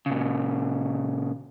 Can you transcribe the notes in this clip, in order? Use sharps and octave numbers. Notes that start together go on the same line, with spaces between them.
A#2 C#3